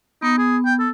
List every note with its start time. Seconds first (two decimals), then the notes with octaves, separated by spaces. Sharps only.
0.22 B3 D#4
0.38 G#4
0.66 G5
0.79 A4